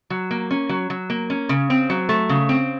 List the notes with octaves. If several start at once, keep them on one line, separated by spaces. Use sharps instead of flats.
F#3
A#3
C#4
F#3
F#3
A#3
C#4
C#3
C4
F#3
A3
C#3
C4